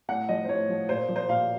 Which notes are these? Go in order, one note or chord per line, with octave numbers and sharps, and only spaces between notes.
A2 F#5
F3 D#5
C5
A2 C#5
F3
A#2 C5
F3
C5
A#2 F5